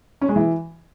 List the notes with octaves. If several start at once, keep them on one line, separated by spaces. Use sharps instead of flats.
C#4
G#3
E3